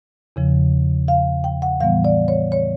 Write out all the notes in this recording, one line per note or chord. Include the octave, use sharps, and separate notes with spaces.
E2 C#3 F3
F5
G5
F#5
A2 E3 G3 B3 F5
D5
C#5
C#5